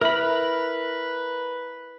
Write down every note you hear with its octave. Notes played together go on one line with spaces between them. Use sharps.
E4 A#4 B4 B5